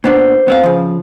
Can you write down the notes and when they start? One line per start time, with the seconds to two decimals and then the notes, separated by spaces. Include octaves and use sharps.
0.04 A#2 B3 D4 C5
0.48 B3 C4 F5
0.63 C#3 F3